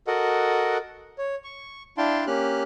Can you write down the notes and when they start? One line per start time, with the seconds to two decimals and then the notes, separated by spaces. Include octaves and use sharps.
0.07 F#4 A4 A#4 D#5 F#5
1.18 C#5
1.44 C#6
1.98 D4 E4 F5 G5 A5 C6
2.27 A#3 C#4 G4 F6 F#6